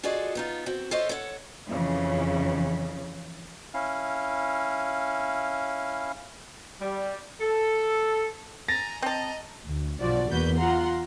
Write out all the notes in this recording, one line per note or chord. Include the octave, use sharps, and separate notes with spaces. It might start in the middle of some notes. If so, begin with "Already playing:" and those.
F4 F#4 G#4 A4 D5 D#5
B3 D#4 F4
C4 F#4
F4 A4 C5 C#5 D#5 E5
A4 C#5 E5 F#5
F2 C#3 E3
C#4 E4 F5
G3
A4
G#5 A#5 A6 A#6
C4 D#5 A5 A#5
D2
B1 G2 F3 F#4 D5
E2 A#3 F#4 B4 G6
F4 F#5 A#5 C6